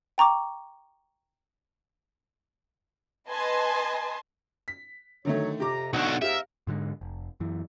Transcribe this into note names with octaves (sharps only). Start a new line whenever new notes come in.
G5 A#5 C#6 D6
B4 D#5 G#5 A5 C6
B6
D3 D#3 F#3 A3 C#5
F2 C3 G4 A#5 D6
B1 D3 F#4 C#7
G#2 B3 G4 A#4 E5 F5
G#2 D3 D#3 G#3
F1
F#2 E3